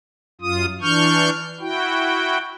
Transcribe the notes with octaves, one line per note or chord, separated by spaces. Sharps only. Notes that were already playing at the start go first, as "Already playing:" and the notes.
F#2 F4 D#6
E3 D4 C#6 F6 G6
E4 F#4 G5